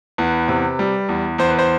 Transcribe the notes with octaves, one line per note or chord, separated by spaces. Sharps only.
E2 B4
C3
G3
E2
E2 C5
B4
C5